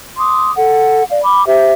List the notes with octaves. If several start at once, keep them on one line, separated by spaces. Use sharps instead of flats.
C6 D6 D#6
A4 F#5
D5 F5
B5 D6
G4 C5 E5